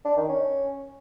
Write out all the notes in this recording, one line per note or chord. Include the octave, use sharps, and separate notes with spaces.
D4
D#3
C#4